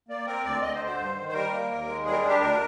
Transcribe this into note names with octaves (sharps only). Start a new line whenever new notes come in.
A#3 D5
C4 A#4
D2 D5
D2 D#5
C5
D3
C5
G2
D#3
C5
G3 A#4
A#3
D#2
G#3
G3 G#4
A#4
G#4
D4
G4
D2 A#4